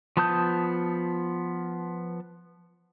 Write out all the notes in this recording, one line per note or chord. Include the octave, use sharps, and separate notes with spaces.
F3 B3 A5 D#6 G6